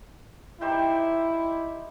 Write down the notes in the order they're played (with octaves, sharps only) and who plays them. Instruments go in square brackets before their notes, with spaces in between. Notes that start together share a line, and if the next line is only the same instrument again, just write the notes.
[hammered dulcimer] D#4 G4 C5 [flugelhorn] E4